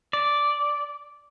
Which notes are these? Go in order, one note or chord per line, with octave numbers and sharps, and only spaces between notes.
D5